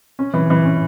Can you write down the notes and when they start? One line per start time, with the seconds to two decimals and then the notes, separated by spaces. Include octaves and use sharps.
0.19 C#4
0.34 E3
0.50 E3
0.65 C#4